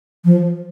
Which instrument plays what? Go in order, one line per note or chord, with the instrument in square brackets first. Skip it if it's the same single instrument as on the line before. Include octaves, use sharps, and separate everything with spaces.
[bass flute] F3